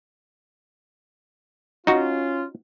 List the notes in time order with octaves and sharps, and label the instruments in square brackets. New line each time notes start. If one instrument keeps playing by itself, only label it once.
[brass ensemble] C#4 F4 [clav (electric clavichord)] D#4 F#4